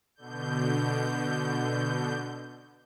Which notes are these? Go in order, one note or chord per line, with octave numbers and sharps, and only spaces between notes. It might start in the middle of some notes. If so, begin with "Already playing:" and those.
B2 D3 G6